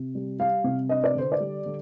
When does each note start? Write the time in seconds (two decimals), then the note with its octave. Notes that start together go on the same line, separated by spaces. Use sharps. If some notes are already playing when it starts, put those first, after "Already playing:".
Already playing: C3
0.15 G3
0.39 G3 F5
0.64 C3
0.89 D4 D#5
1.04 D5
1.15 D3 C5
1.32 D5
1.40 G3
1.66 D3